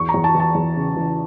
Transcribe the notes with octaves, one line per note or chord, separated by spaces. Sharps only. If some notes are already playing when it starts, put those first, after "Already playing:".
Already playing: E2 C#6
A#5
E2
A5
E3
A5
E2
C#3
E3